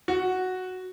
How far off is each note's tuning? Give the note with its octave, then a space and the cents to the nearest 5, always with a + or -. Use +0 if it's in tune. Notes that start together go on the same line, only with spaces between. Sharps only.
F#4 +0